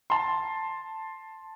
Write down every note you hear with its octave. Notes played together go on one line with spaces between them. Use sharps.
A5 C6